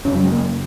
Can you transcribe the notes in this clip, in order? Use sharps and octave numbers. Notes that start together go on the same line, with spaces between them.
F#2 C#3 C#4
F#3
G#3
A#3